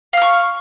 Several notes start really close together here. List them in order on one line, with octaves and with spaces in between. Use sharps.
F5 F6 C#6